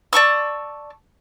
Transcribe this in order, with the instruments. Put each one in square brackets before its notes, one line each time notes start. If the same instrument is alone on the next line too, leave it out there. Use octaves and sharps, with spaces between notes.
[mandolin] D5 A5 C#6 E6